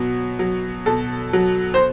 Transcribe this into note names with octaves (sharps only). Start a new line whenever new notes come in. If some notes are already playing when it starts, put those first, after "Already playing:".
Already playing: B2 F#3
F#3
B2 A4
F#3
C5